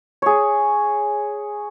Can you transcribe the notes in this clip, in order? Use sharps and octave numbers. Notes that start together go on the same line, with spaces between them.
G#4 C#5